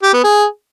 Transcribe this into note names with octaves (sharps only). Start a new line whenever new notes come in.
G4
B3
G#4